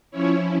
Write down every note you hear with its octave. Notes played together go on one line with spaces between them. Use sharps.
F3 C#4 E4 C#5